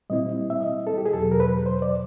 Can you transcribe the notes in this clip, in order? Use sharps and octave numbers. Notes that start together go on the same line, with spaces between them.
A#2 G3 C4 E4 D#5
E5
D#5
A4
G4
G#4
E2 B2 F#3 A4
A#4
B4
C5
D5